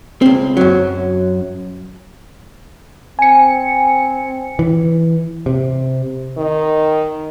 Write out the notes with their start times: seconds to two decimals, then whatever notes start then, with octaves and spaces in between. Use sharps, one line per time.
0.22 C#2 C4
0.57 F#2 F#3
3.19 C4 G#5 C#7
4.59 E3
5.46 C3
6.38 D#3